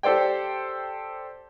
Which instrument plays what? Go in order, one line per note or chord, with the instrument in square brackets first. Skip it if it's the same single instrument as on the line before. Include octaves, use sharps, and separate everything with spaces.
[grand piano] G4 A4 C5 D5 G5